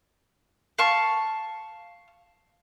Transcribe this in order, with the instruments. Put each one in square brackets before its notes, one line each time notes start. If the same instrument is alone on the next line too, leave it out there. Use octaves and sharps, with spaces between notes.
[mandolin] F5 A5 C#6